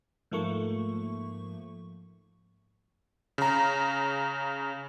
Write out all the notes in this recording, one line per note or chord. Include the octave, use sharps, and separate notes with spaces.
G#2 F3 A3 A#3 C#6
C#3 A#5